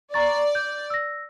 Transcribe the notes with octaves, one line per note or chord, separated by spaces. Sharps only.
D5 A#5 C#6 A6
G6
E6 A#6